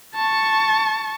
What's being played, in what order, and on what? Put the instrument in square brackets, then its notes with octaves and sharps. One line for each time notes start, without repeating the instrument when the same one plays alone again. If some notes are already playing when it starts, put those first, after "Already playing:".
[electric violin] A5 C#6